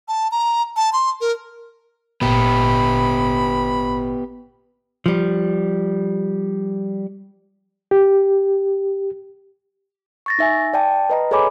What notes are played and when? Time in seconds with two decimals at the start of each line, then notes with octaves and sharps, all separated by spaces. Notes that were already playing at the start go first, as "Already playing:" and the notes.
0.08 A5
0.32 A#5
0.76 A5
0.93 C6
1.21 A#4
2.21 G#1 A#2 B3 G4 B5
5.06 F3 G3
7.91 G4
10.26 C#6 A6 A#6
10.39 D#4 E5 G#5
10.73 D5 G5 A5
11.10 B4 D#5 A#5
11.31 G#4 A4 C#5 G#5 B5 D6